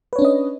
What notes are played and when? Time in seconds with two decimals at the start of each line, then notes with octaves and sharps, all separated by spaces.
0.13 B4
0.16 C#5
0.19 D4
0.22 C#4
0.25 D#5